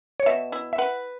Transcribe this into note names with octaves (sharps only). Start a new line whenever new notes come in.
C#5
B2 E5
E4
E5
B4 F#5